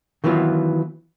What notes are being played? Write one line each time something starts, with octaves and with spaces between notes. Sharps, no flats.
D#3 E3 F#3 B3 F4